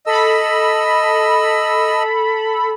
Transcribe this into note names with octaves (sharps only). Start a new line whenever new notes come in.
A4 D#5 B5 E6